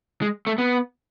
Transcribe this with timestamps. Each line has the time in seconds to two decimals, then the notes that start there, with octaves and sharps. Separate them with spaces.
0.22 G#3
0.47 A3
0.58 B3